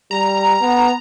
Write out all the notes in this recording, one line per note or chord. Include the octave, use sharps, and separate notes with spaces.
G3 A#5
B3